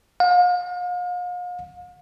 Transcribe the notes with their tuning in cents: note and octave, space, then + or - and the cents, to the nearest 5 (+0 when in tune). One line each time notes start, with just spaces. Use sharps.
F5 +40